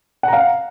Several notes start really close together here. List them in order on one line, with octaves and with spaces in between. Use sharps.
F#5 A#5 F5